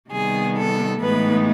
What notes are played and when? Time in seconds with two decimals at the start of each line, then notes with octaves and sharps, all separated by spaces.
0.10 C3 D#3 G3 B3 G#4
0.56 A4
1.02 A2 E3 G#3 B3 D#4 B4